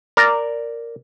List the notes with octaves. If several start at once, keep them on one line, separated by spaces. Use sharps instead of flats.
A#4 D5